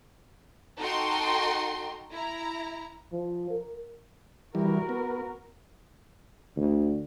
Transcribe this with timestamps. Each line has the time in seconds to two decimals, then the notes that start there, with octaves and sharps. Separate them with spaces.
0.79 D#4 F#4 A4 G5 A#5 C6
2.12 E4 A#5
3.13 F3
3.51 A#4
4.55 E3 G3 F#4 A#4
4.89 B3
6.57 D2